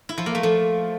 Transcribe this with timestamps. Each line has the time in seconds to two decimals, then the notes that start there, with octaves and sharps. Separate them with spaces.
0.09 E4
0.18 F3
0.26 A#3
0.35 A3
0.43 F3